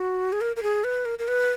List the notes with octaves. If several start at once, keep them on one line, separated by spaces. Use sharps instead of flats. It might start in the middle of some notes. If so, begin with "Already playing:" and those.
Already playing: F#4
G#4
A#4
A#4
G#4
B4
A#4
A#4
B4